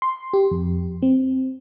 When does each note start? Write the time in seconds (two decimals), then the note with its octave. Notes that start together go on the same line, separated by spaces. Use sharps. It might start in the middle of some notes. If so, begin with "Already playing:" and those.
0.02 C6
0.33 G4
0.51 F2
1.02 C4